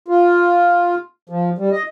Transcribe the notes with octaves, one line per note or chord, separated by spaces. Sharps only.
F4
F3
G3
D#5